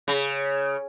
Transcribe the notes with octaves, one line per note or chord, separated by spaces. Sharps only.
C#3